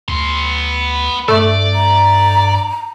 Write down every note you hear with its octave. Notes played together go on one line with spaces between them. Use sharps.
D2 B3 C6
G2 A3 D5
A#5